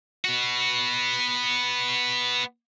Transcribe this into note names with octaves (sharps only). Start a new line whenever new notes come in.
B3 F#4